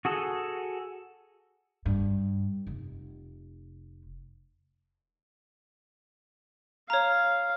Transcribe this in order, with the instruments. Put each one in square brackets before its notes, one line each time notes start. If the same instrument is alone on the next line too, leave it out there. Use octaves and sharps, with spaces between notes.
[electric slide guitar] F#4 G#4 A4
[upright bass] G2
F1
[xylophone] C#5 A#5 [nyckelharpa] F5